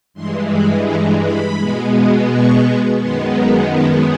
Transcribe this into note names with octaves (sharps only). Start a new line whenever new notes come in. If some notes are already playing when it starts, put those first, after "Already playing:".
G2 E3 G#3 C6
B5
A#5
B5
B2 G#3 B3
C#6
F#2 D#3 G#3 B3 C6
A#5
A5